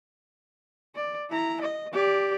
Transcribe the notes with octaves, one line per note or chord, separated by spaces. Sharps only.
D5
E4 A#5
D#5
G4 D5